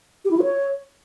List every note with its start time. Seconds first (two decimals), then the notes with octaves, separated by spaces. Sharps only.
0.25 G4
0.31 E4
0.37 F4
0.43 C#5